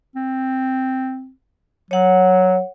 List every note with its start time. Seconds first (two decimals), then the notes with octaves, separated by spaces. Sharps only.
0.16 C4
1.91 F#3 C#5 F#5